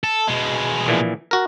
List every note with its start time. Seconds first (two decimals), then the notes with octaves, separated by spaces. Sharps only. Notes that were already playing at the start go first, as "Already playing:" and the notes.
0.03 A4
0.28 B2 G#3
0.87 A#1 A#2 E3
1.31 F#4 A#4